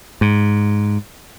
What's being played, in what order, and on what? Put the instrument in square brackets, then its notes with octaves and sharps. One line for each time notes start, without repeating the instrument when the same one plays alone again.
[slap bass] G#2